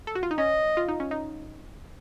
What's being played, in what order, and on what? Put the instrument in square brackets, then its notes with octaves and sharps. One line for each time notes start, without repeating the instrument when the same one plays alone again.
[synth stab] A4
F#4
F4
D#4
[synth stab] C#4 [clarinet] D#5
[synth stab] F4
D#4
C#4
D#4